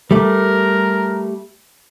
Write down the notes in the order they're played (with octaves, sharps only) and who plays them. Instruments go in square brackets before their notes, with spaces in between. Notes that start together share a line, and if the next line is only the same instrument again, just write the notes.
[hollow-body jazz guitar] G3 A3 [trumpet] A#4